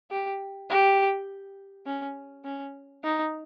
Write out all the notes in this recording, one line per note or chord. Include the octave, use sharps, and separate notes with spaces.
G4
G4
C#4
C#4
D#4